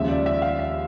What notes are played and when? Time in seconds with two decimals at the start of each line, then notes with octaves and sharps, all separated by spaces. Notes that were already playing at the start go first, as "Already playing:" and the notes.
Already playing: D#2 C#3 F3 G#3 E5
0.09 D5
0.26 E5
0.42 F5
0.59 E5